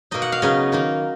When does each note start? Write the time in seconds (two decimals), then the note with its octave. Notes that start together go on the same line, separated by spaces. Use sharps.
0.11 B2 A#3 D#4 D#5
0.22 F#5
0.32 F5
0.42 C#3 F#3 B3 D#4 D#5
0.72 D#3 A#3 D#4